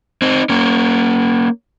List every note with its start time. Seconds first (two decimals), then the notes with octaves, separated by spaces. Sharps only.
0.22 C4 D#4
0.49 A#3 C#4